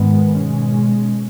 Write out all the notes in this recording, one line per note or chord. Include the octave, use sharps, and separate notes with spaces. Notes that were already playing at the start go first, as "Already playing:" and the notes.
Already playing: G#2 D#3 G#3 B3
B2 G#3 C#4